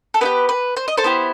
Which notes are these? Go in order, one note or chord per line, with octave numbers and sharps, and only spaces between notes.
A4
B3 E4 G4 B4
B4
C5
D#5
A4 C5
B3 E4 G4